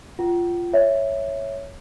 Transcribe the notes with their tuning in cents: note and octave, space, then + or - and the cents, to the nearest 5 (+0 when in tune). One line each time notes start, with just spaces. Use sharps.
F4 -10 F#5 +45
C#5 +0 E5 +0